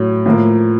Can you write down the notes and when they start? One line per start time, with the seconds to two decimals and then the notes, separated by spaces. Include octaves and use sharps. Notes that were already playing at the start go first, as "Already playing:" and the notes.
Already playing: A2 F#3
0.26 A2 F3 A#3